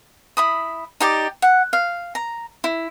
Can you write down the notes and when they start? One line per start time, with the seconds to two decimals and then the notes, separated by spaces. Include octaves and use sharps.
0.37 E4 B5 D#6
1.00 D#4 G4 D5
1.42 F#5
1.73 F5
2.15 A#5
2.64 E4